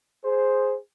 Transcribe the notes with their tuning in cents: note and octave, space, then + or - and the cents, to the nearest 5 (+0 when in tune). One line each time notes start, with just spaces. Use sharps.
G#4 +0 C5 +0